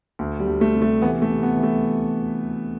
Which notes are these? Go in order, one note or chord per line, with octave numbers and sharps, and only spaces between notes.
D2
G3
D2
A3
C3
A3
E3 B3
A3
C3
B3
E3
A3